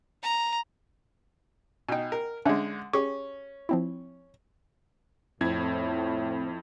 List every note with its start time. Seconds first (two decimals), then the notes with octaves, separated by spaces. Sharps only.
0.22 A#5
1.89 B2 D#4 G5 G#5
2.12 A#4
2.45 D3 G#3 C#4 D4 E5
2.93 C#4 G4 G#4 C#6
3.69 F3 C4 E4
5.41 F2 A2 C4 E4 G#6